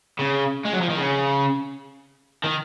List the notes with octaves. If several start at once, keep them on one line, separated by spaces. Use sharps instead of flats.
C#3
G#3
F#3
F3
D#3
C#3
D#3